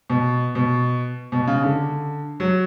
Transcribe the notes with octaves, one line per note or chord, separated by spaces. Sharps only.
B2
B2
B2
C#3
D3
F#3